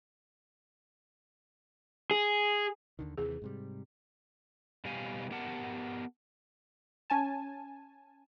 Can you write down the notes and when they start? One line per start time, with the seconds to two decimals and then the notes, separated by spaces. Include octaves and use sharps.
2.11 G#4
2.99 D#2 D3 D#3
3.18 D#2 C3 E3 G#4
3.42 G#2 C3 G3
4.85 B2 G3 G4 F5 G#5
5.31 B3 G4 A#4 F#5 A5
7.10 C#4 G#5 A5